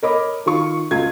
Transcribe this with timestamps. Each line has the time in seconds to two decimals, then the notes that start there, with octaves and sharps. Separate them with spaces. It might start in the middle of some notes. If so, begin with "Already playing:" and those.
0.03 A#4 C#5 D#5 B5 D6
0.46 D#3 F4 C#6
0.91 C#2 F4 G#6